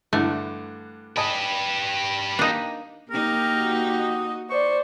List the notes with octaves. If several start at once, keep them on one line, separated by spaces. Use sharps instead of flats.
G2 D3 E3 A3
G4 B4 D#5 G#5 A5
A#3 D4 D#4
A#3 D#4 G4 A#4
F#4
D#5
C5 D5 C#6